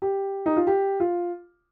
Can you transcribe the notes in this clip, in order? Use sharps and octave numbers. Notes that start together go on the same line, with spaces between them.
G4
D#4
F4
G4
F4